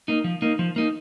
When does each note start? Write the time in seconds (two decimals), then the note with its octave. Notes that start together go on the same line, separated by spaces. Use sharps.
0.08 A#3 D#4
0.24 F3
0.42 A#3 D#4
0.59 F3
0.76 A#3 D#4